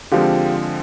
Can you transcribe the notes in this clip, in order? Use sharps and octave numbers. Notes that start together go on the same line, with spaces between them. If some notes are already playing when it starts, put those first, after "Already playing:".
D3 F3 G#3 C4 F4 G4